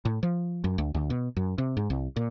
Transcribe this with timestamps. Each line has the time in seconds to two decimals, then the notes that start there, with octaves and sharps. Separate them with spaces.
0.05 A2
0.23 F3
0.64 F#2
0.78 D2
0.95 D2
1.10 B2
1.37 F#2
1.58 C3
1.77 G#2
1.90 C2
2.16 A#2